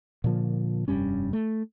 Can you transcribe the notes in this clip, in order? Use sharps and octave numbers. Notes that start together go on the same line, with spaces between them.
A#2 D3 F3 A#3
F1 G2 G3 C#4
A3